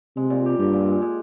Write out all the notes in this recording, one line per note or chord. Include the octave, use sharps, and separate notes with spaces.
C3 G#3
A#2
G4
G2 G4
A#2
G#3
G#3